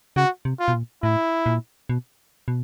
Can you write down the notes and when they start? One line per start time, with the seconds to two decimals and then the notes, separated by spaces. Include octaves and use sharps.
0.16 C#3 F#4
0.45 C3
0.59 F4
0.68 B2
0.74 A#2
1.03 A2 E4
1.46 A#2
1.89 B2
2.48 B2